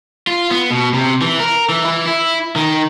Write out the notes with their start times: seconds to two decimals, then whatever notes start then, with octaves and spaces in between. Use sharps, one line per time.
0.27 F4
0.51 B3
0.71 B2
0.94 C3
1.21 E3
1.40 A#4
1.69 E3
1.85 E3
2.06 E4
2.56 D#3